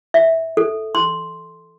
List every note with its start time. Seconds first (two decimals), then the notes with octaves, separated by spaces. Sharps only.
0.14 E5
0.57 A4
0.95 C6